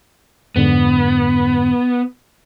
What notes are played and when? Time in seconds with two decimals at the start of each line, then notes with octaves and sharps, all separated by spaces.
0.56 F2 G#2 D3 B3